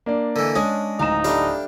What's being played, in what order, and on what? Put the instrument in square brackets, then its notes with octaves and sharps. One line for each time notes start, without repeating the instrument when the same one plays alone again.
[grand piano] A#3 D4 D5
[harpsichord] D3 E3 [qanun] D#5
[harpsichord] G#3 [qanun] C#4 D4 C#6 [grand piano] D#6
[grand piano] D1 A#5 E7 [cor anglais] D#4 [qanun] F5
[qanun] G3 A3 D4 [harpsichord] G4 F5